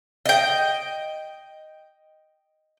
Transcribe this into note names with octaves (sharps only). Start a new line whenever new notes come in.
D#5 G5